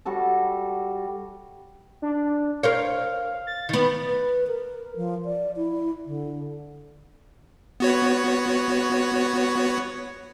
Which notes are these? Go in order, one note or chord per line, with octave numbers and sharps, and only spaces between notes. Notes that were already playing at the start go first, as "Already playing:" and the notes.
G3 F#4 A4 A5
D4
A#4 C5 C#5 F5
A6
D#3 B3
B4
A#4
F3
D5
E4
D3
B3 F#4 C#5